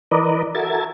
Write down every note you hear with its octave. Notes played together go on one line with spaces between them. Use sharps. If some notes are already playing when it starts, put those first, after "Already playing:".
E3 A#4 B4 D5 D#5
F#4 A4 A#4 E5 G#6 A6